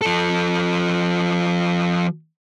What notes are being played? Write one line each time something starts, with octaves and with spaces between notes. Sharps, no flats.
F3 A4